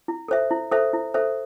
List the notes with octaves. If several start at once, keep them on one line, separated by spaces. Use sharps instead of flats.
E4
A4 C5 E5
E4
A4 C5 E5
E4
A4 C5 E5